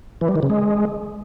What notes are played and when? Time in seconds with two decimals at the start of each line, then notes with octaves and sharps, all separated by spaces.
0.21 E3
0.28 G3
0.36 D#3
0.43 C#3
0.50 G#3